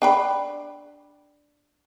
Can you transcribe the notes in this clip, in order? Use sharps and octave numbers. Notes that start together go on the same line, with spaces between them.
D4 G5 B5